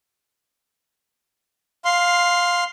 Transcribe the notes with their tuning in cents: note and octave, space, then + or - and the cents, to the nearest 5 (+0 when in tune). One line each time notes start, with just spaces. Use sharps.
F5 +10 C6 +0